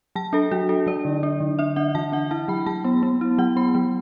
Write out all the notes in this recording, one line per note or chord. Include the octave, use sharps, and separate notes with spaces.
F#3 A5
D4 A4
F#3 F#4
D4 A4
F#3 D5
D3
D4
D3
D4 E5
D4 F#5
E3 A5
D4 F#5
E4 A5
F#3 B5
F#3 A5
B3
B3
E4
F#3 F#5
B3 B5
F#3